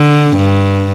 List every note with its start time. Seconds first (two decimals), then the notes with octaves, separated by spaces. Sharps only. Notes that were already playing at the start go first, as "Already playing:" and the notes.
Already playing: D3
0.37 G2